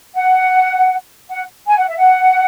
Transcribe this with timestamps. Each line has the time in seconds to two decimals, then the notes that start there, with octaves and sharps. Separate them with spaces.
0.15 F#5
1.29 F#5
1.67 G#5
1.77 F#5
1.88 E5
1.98 F#5